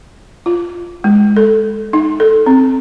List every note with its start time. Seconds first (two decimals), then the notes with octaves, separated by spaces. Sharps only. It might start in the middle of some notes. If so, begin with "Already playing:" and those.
0.46 F4
1.04 G#3
1.37 A4
1.93 D#4
2.20 A4
2.46 C4